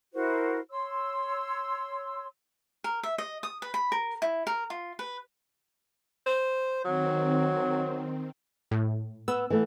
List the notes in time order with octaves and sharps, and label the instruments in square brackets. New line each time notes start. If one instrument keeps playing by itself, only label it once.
[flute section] E4 F#4 A#4 C5
C#5 C6 E6
[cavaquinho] A#4
E5
D#5
D#6
B4
B5
A#4
E4
A#4
F4
B4
[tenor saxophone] C5
[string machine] D#3 C4 [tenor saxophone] F#3
[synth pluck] A2
[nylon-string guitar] B3 [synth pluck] E6
[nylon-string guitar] E3 A3 B3